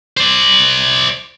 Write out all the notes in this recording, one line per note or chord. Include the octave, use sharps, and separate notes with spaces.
C5 D5